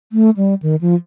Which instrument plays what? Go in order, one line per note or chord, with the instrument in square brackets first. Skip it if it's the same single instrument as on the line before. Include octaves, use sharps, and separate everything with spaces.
[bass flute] A3
G3
D#3
F3